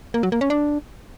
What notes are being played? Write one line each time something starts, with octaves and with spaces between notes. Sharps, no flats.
A#3
F#3
A#3
C#4
D4